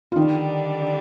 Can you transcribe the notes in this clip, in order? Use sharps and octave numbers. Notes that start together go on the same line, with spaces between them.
F4
D3 D#3 G3 D4 D#4